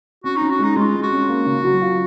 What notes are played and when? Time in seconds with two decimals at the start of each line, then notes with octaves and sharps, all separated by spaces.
0.24 C#4 F#4
0.37 C#4 D#4
0.50 F#4
0.59 G#3 D#4
0.76 G#3 F4
0.94 G#3
1.03 F#4
1.12 C#4
1.29 A#3
1.46 C#3
1.64 F#3
1.82 F4